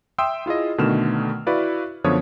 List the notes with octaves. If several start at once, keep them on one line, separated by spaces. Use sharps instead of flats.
E5 G5 C6 D#6 E6
E4 F4 G#4 D#5
B2 D3 D#3 A3 F6 E7
E4 F#4 B4 D5 F5
F#2 D3 F3 B3 C#5 D#6